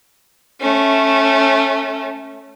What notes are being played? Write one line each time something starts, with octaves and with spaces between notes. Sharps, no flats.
A3 C#4